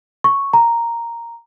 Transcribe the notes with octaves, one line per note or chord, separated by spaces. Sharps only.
C#6
A#5